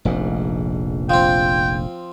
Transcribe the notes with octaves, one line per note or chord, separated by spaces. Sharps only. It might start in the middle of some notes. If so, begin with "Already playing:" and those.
F1 A#1 G#2
F3 C4 G5